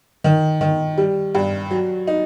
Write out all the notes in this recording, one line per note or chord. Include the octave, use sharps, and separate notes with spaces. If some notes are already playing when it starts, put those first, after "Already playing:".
D#3
D#3
G3
G2
F#3
D#4